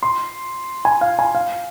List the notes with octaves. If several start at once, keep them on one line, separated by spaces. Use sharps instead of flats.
C6
G#5
F5
G#5
F5